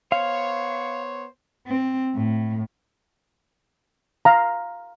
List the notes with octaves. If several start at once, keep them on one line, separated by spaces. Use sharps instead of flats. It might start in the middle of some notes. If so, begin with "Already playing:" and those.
B3 C5 C#5 F5
C4
A2
F5 A#5